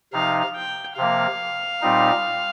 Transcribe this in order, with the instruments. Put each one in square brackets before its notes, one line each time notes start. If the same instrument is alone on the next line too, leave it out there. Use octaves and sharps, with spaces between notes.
[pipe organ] C3 F3 D#4 [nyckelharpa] F5
[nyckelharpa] G5
[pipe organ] C3 F3 A#3 [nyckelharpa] F5
[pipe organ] A#2 G3 C4 D#4